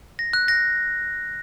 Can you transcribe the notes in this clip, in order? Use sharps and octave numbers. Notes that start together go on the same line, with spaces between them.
A#6
F#6
A#6